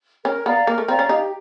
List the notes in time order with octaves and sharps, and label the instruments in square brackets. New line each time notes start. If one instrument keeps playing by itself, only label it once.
[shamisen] C#4 [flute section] A#4
[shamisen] B3 [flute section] D5 F5 A#5
[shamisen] A#3 [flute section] A#4
[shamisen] A3
[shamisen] C4 [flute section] D5 F5 A#5
[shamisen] C#4
[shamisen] D#4 [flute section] G4